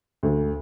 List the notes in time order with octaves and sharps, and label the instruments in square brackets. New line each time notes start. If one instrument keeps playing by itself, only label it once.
[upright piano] D2